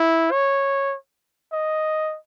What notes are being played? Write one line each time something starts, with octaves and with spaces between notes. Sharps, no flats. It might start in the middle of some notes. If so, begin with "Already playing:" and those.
Already playing: E4
C#5
D#5